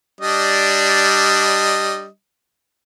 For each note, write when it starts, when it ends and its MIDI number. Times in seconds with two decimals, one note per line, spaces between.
0.21 2.06 55
0.21 2.06 62
0.21 2.06 75